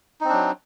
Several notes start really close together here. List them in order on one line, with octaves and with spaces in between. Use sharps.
D#4 C4 D4 F#3